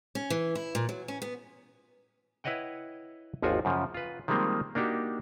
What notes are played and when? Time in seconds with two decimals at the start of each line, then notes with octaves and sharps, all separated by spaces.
0.15 C#4
0.30 E3
0.55 E4
0.75 A#2
0.89 F#3
1.08 C#4
1.22 B3
2.44 E4 B4 C#5 D#5 F#5 G5
3.43 G#1 D#2 F3 F4 F#4 G#5
3.65 F#2 C#3 F3
3.94 F4 B4
4.28 D#3 F3 G3 G#3 A#3 C4
4.75 A#3 D4 D#4 F#4 G4